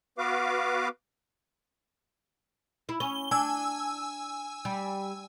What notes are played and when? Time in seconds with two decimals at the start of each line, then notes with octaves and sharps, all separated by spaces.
0.18 B3 F#4 B4 F5 D6
2.89 E4
3.00 C#4 G7
3.31 D4 G#5 E6
4.65 G3